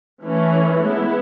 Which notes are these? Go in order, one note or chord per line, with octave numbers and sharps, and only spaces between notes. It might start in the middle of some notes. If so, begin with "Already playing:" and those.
E3 A3 C#4
G#3 B3 E4